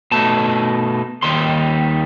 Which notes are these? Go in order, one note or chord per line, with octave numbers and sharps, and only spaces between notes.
B2 A3 D#4 A5
D#2 D#3 G3 D#4 C6